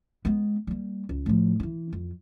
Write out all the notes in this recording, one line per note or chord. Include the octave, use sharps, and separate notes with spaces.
G#3 B3
G3 A#3
C#2
A2 F3
D#3 E3
F2